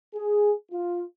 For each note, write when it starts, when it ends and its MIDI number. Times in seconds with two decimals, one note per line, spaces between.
0.15 0.52 68
0.72 1.03 65